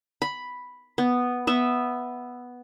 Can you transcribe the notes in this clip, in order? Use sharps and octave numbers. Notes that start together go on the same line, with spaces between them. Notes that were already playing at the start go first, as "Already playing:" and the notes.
B5
B3
B3 E5